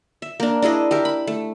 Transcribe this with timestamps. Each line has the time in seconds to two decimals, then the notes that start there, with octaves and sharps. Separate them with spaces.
0.22 E5
0.40 A#3 D4
0.62 D4 E4 G#4 D#5
0.91 G4 A#4 E5
1.05 B5
1.27 A3